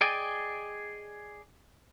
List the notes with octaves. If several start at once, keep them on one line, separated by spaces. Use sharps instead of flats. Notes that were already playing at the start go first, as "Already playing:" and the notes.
G#4 D5 D#5 G5 G#5